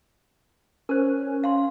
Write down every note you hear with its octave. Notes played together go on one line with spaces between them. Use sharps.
C#4 A#4 C5
F5 C6